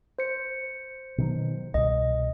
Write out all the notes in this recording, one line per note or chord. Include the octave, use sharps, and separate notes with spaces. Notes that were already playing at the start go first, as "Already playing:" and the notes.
C5 C#7
B2 D#3 F#3
C2 B2 D#5